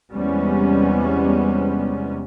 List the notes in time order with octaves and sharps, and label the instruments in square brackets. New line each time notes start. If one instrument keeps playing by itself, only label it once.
[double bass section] E2 C3 G3 G#3 B3 C#4